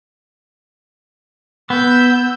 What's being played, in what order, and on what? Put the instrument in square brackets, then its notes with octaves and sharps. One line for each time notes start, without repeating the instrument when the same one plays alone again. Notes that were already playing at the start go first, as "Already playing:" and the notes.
[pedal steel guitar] B3 [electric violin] E6 G6